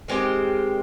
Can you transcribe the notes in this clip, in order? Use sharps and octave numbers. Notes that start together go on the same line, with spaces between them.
D#3 G#3 C4 G4